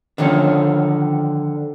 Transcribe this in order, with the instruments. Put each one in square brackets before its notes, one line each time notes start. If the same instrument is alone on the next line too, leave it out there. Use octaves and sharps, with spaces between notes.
[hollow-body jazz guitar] D3 D#3 F3 C#4